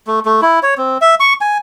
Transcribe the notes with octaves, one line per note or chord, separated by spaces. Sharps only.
A3
A3
E4
C#5
C4
E5
C#6
G#5